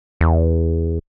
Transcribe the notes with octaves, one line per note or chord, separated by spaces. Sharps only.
E2